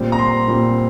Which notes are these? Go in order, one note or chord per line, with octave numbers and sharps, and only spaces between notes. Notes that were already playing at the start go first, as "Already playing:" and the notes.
Already playing: A#2 G3 C4
A#5
C6
A#2 G3 C4